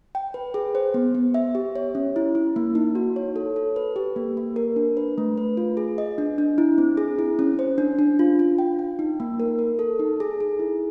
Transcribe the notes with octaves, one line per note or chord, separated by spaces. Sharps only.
G5
B4
G#4
C5
B3
B3
E5
G4
C#5
C#4
E4
E4
A#3
D#4
F#4
C#5
A4
A4
B4
G4
A#3
A#3
A#4
D4
B4
A3
B4
F4
G#4
D#5
D4
D4
E4
C4
G#4
E4
C#4
C5
D4
D4
F4
F4
G5
G5
D#4
A#3
A#4
A#4
A4
D#4
G#4
G#4
E4